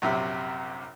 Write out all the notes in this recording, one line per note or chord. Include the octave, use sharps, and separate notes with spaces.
A#1 F#2 C3